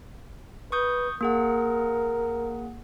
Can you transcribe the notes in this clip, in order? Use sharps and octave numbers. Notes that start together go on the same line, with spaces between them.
B4 C#6 D#6 G6
A#3 G#4 A#4 F#5